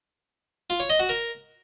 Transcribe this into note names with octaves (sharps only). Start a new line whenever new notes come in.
F4
C#5
D#5
F#4
A#4